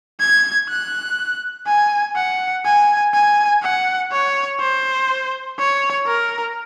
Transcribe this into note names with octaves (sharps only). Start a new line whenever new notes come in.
G#6
F#6
G#5
F#5
G#5
G#5
F#5
C#5
C5
C#5
A#4